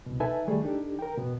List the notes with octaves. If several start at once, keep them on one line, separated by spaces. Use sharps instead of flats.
C2 B2
D#4 A4 B4 E5 G#5 A5
D#3 G3 A3 G#4 A4
D4 D#4 G4 A4
A#4 G5
B2 B3